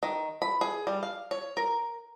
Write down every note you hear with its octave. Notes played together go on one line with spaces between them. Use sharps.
D#3
B5
G#4
G3
F5
C#5
A#4